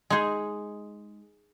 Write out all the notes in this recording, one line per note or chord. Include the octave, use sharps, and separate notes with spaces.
G#3 D#4 G#4